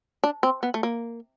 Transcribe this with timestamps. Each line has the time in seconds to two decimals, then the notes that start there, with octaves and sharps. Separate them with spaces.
0.24 D4
0.43 C4
0.63 B3
0.74 A3
0.83 A#3